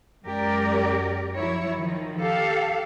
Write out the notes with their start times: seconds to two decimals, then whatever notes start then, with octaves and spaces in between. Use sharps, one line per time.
0.24 F#2 G#3 G4 A#4 D5
1.35 F3 F#3 E4 C#5
1.78 D#3 F3
2.18 G4 A4 F5